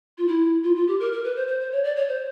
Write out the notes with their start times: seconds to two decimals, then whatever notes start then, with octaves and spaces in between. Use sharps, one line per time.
0.18 F4
0.28 E4
0.64 F4
0.76 F4
0.88 G4
1.00 A#4
1.12 A#4
1.24 B4
1.36 C5
1.47 C5
1.60 C5
1.72 C#5
1.84 D5
1.96 C#5
2.09 C5